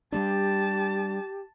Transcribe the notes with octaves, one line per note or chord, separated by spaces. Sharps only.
G3 G#3 D4 G4 A5